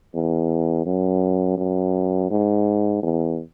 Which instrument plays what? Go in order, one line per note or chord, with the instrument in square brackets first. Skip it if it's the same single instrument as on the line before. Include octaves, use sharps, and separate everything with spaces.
[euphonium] E2
F#2
F#2
G#2
E2